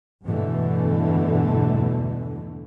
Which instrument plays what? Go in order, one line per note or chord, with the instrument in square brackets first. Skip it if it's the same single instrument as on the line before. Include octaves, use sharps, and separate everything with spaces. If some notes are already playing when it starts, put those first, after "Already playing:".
[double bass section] E2 G2 B2 D3 E3 A3